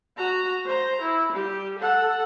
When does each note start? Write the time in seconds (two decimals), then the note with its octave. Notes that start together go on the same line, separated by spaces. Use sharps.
0.17 F#4 A#5
0.66 C5 A#5
1.02 E4
1.33 G3 G4
1.79 A4 F#5